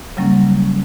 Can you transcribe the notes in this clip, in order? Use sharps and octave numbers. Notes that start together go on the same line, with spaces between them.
C#3 F#3 G3 A#3 C#4